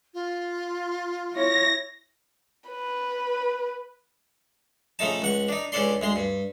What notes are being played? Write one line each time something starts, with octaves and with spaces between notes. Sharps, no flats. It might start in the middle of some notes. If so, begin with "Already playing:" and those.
F4
E4 C#5 A#6
B4
C#3 F3 A3 D#4 A5
C#2 F#5 C#6
D4 D#4
C#2 C#4 D4 A4 D5 C6
D2 G#3 C6
G2